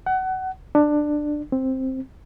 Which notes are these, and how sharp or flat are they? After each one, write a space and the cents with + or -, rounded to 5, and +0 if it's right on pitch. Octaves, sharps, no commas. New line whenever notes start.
F#5 +25
D4 +15
C4 +5